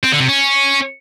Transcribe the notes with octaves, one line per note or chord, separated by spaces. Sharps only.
C4
D3
C3
C#4